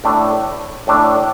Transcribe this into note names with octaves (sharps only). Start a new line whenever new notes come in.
A2 A3 D4
A2 A3 D4